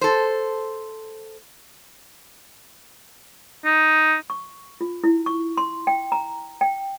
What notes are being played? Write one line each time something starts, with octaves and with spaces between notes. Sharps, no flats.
A4 C5
D#4
C#6
F4
E4
C#6
C6
G5
A#5
G5